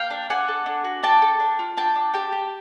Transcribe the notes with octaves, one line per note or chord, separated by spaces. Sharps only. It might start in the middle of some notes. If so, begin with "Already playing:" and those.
Already playing: A#3 F5 G5
D4
D4 F#5 G#5
A4
D4
F#4
D4 G5 A5
A4
D4
F4
D4 G5 A5
D4
G4 G5 A5
G4